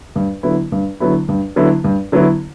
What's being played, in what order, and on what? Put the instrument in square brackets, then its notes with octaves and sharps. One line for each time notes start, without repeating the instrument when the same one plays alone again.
[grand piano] G2
D3 F#3 B3 E4
G2
D3 F#3 B3 E4
G2
D3 F#3 B3 E4
G2
D3 F#3 B3 E4